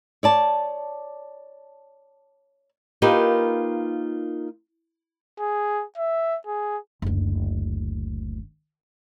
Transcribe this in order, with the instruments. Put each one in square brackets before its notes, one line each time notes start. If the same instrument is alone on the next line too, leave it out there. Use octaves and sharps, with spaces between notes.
[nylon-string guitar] C#5 D5 A5
A#3 D#4 F4 G4 A#4 B4
[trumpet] G#4
E5
G#4
[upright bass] F#1 D2